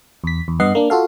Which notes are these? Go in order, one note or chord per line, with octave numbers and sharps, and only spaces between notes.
E2 B6
E2
G2 B3 D#5 F#5 C7
A#3 D4
F4 F#4 A4 F5